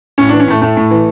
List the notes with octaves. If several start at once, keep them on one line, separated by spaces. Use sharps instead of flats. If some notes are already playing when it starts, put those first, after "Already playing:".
A2 C#4
E3 D4
C#4
A2 A3
A2 A3
A2
E3